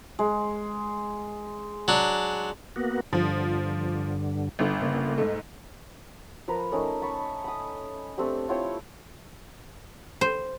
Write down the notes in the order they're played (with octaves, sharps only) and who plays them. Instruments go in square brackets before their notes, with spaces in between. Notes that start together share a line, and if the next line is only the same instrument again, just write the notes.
[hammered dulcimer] G#3
[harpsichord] F#3 D4
[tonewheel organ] A#3 B3 F#4
[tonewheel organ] G2 D3 [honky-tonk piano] F3
[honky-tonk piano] G1 D3
[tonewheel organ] C#3 A#3
[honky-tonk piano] G#2 A3
[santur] F3 A#4 B4 A#5
A3 C#4 D#4 A#4
A5 B5 C#6
B5 D#6
A3 C4 D4 G4
E4 F4 C#5 G5
[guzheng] C5